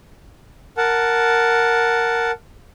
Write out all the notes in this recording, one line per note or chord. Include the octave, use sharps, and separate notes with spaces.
A#4 F#5 A5